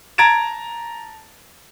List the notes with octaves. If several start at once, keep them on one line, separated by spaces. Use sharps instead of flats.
A5 A#5 G#6 A6 D7 E7